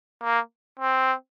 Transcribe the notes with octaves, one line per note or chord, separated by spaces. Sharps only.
A#3
C4